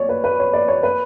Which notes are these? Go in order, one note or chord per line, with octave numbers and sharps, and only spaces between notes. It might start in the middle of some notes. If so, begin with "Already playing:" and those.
Already playing: C#5 D5
B4
B4
C#5
D5
C#5
B4